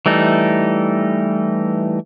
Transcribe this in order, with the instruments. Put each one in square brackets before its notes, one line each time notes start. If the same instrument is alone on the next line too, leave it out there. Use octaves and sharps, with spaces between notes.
[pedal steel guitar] E3 G3 A3 D#4